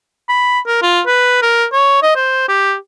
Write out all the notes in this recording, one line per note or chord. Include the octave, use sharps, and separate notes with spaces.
B5
A#4
F4
B4
A#4
C#5
D#5
C5
G4